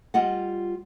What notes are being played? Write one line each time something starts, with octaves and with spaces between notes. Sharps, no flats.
G3 F4 D#5 F#5